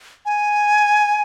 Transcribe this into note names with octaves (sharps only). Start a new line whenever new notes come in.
G#5